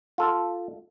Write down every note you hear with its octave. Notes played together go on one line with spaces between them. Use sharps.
F4 A4